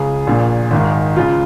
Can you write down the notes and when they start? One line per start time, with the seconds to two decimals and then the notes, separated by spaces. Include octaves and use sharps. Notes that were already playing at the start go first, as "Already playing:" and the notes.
Already playing: C#2 C#3 G#4
0.27 A#1 A#2
0.71 G#1 G#2 D#3
1.16 C#2 C#3 F4